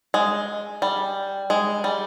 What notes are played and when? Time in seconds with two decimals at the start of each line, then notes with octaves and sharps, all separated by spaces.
0.14 G#3
0.82 G3
1.50 G#3
1.84 G3